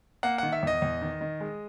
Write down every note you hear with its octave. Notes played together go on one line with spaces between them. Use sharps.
A#3 F#5
D#3 F#5
E5
E2 D#5
E2
D#3
D#3
G#3